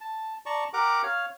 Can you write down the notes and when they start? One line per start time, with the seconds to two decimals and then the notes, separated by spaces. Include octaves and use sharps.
0.01 A5
0.46 D5 A5 A#5 C#6
0.73 G4 A#4 F#5 A#5 D6
1.03 C#5 F5 F6